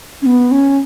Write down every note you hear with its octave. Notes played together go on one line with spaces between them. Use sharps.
C#4
B3
C#4